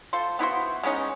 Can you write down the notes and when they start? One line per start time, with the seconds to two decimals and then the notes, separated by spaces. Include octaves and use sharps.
0.13 F4 A4 C5
0.39 B3 E4 F#4 C5
0.83 G#3 B3 C#4 D#4